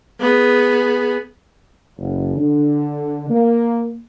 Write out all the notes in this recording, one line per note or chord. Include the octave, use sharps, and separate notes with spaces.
B3 G#4
F#1
D3
A#3